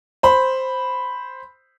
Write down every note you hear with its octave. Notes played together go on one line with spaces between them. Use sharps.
C5 B5